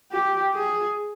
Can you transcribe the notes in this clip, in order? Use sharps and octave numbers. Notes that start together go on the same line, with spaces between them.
G4
G#4